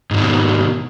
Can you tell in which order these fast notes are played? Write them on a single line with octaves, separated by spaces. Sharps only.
G#2 F3 D#3 B2